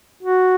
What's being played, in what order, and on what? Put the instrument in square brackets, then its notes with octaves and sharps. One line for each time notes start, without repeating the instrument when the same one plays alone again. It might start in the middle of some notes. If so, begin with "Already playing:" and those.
[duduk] F#4